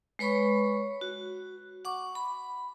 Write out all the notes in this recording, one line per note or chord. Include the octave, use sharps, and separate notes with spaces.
G#3 B4 C#5 B5 C#6
F#4
F#5 C#6 D6
B5